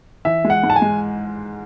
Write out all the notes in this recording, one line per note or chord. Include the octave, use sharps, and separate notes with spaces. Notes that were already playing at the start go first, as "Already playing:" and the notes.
E3 E5
G#3
F#5
G#2
A5
G#5
G#3